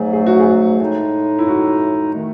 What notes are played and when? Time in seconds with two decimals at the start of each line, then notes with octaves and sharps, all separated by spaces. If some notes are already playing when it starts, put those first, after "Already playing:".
Already playing: G#2 F#3 A3 G#4
0.13 G#4
0.26 F#4
0.39 G#4
0.80 A2 G#3 D#4
1.39 E4
1.48 F#4
2.14 D#3 A3